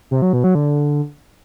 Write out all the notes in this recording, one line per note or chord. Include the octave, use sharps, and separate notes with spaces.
C3
F#3
B2
F#3
D3